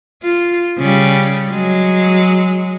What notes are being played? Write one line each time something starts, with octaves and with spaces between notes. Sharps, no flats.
F4
C#3 G3
F#3 G#3